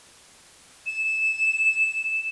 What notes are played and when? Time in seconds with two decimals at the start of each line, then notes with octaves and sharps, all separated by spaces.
0.86 E7